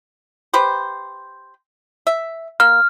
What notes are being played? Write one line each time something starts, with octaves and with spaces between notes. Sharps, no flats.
G4 B4 C5
E5
A#3 F6